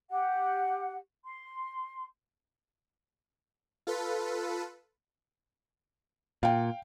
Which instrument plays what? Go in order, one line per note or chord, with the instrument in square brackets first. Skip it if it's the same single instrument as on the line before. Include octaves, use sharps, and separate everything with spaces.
[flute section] G4 F#5
C6
[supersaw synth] F4 A4 B4
[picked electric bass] A#2 [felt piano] F5 G5